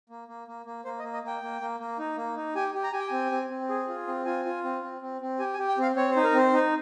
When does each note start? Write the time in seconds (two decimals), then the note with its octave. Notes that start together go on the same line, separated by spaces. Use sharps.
0.10 A#3
0.28 A#3
0.48 A#3
0.66 A#3
0.85 A#3 C5
0.99 D#5
1.03 A#3
1.13 D#5
1.23 A#3 G5
1.42 A#3
1.61 A#3
1.80 A#3
1.98 D#4
2.17 A#3
2.36 D#4
2.55 G4 G#5
2.75 G4
2.84 A#5
2.92 G4 G#5
3.00 G5
3.07 C4 G#5
3.32 C4
3.50 C4
3.69 G#4
3.88 F4
4.07 C4
4.25 F4 G#5
4.45 F4
4.64 C4
4.83 C4
5.02 C4
5.21 C4
5.39 G4 G#5
5.54 G#5
5.59 G4
5.68 G5
5.78 C4 F5
5.96 C4 C#5
6.11 C5
6.16 D#4
6.24 A#4
6.34 C4 C5
6.53 D#4